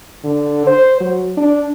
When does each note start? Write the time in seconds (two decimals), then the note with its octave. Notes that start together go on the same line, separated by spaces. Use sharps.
0.24 D3
0.67 C5
1.01 F#3
1.37 D4